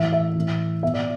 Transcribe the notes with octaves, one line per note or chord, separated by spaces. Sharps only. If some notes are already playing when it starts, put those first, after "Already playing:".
Already playing: A2 E3 E5
E5
A2 E3
B2 E5
D5